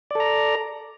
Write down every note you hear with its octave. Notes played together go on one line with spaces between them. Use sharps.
A4 D5 A#5